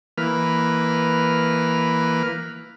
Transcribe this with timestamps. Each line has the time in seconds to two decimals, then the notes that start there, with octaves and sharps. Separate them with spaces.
0.18 E3 A#3 B4 F6